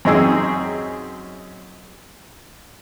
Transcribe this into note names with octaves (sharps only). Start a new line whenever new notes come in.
F#2 C4 D#4 G#4 E6